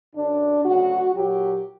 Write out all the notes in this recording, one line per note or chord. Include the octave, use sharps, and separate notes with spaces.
F#2 D3 F#3 D4
D2 C#3 F#3 F#4
A#2 F#3 G4